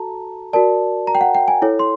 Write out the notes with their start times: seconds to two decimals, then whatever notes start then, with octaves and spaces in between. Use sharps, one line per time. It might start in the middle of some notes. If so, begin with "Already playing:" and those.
Already playing: F#4 A4 A5 A#5
0.53 F#4 A#4 D5 A5
1.07 A#5
1.15 G5
1.21 F#5
1.35 G5
1.48 G#5
1.62 E4 A4 C#5
1.79 C6